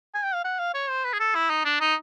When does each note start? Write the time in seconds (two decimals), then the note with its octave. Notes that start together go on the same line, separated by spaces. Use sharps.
0.14 G#5
0.23 G5
0.34 F5
0.44 F#5
0.59 F5
0.74 C#5
0.89 C5
1.05 B4
1.13 G#4
1.19 A4
1.35 E4
1.50 D#4
1.65 D4
1.81 D#4